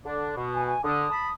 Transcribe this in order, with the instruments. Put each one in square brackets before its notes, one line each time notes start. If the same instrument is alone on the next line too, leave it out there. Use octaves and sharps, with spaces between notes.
[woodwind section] D3 D4
B2
[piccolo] G#5
G#5
[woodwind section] D3 [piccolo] D#6
[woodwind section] A5 B5